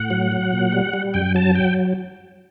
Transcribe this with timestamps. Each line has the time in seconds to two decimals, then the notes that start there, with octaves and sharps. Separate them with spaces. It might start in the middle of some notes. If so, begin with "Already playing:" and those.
Already playing: A2 F#5
0.10 F#3
0.32 F#3
0.53 A#2
0.72 G3
0.93 G3
1.14 F#2 G5
1.35 F#3 A5
1.55 F#3 G5